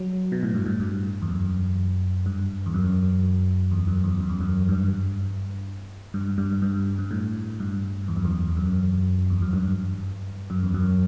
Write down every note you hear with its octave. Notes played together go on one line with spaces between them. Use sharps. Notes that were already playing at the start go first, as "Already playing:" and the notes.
Already playing: F#3
B2
A2
G2
A2
G2
E2
F#2
G2
E2
F#2
E2
F#2
E2
F#2
E2
F#2
G2
G2
G2
G2
G2
A2
G2
E2
F#2
E2
F#2
E2
F#2
G2
F#2
E2
F#2